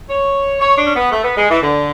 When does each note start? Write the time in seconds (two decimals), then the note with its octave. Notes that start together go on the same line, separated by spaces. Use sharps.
0.09 C#5
0.60 C#5
0.78 D4
0.86 C#4
0.95 B3
1.11 A3
1.23 B3
1.37 G#3
1.50 E3
1.62 D3